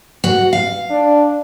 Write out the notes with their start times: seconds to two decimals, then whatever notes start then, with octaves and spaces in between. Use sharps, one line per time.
0.24 F#4
0.53 F5
0.90 D4